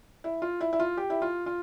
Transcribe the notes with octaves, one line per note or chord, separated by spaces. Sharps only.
E4
F4
E4
E4
F4
G4
E4
F4
F4